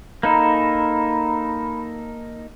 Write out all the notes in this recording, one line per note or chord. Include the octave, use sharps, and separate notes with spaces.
A#3 D#4 A4 A#5 B5